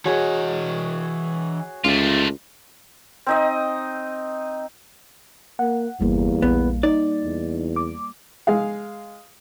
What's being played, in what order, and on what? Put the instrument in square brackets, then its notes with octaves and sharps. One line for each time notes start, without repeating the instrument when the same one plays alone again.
[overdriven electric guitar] E3 D#5 [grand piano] F#4 G#4 C#5
[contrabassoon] C#2 [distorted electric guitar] A3 F4
[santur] C4 D#4 D#5
[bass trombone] A#3 [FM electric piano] F#5
[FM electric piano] G1 [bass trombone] E2 [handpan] G3 A#3
[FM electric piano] A#1 [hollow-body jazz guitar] B3
[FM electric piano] D#4 [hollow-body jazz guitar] D5
[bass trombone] E2
[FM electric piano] D6
[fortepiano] G#3 G#4 F5